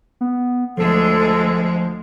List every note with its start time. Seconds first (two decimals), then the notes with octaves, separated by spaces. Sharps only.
0.21 B3
0.77 D2 F3 G#3 A4